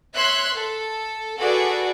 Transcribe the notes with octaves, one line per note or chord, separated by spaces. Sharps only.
C#5 E5 C6 F#6
A4
F#4 G#4 A4 B4 D5